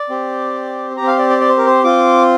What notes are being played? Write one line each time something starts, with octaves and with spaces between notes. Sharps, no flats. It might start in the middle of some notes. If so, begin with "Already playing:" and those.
Already playing: D5
C4 G4
C4 G4 A#5
F5
D5
D5
D5
C5
A#4
C5
C4 F4 D6